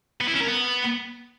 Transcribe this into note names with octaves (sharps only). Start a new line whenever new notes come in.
B3
E4
C#4
A#4
B3